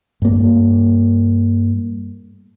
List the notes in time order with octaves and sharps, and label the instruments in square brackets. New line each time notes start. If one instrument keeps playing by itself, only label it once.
[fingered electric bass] G2 A#3